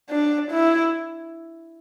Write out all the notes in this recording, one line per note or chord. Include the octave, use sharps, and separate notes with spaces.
D4
E4